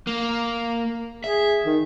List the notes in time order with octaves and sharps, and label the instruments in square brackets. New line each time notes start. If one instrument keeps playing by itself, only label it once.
[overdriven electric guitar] A#3
[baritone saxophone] G#4 [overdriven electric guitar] E5
[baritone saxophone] D#3